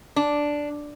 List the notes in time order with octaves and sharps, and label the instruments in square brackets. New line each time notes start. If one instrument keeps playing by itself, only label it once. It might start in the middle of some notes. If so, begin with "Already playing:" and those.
[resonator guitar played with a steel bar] D4